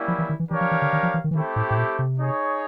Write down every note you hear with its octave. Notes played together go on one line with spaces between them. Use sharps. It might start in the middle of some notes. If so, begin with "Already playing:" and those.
Already playing: G3 A#3 C#4 E4
F3
E3
D#3
E3
E3 D4 G4 A#4 C#5 F5
F3
E3
D3
D#3
F3
E3
D#3
E3
D#3 A3 C4 E4 G4
A2
A2
A#2
C3
D#4 G#4 C#5